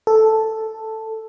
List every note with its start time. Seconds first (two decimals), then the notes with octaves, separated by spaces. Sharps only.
0.07 A4